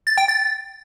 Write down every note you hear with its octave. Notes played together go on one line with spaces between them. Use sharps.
A6
G5
A6